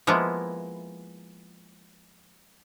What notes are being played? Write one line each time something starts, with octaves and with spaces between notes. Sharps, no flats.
F3 G#3 A#3 B3 E4